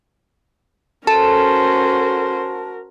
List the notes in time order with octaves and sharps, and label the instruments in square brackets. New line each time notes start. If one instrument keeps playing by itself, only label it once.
[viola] C#4 C5 [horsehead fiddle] F#4 A#4 [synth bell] A4 [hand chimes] A5